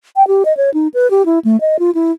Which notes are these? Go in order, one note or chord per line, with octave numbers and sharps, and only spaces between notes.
G5
G4
D#5
C#5
D#4
B4
G4
E4
A3
D#5
F4
E4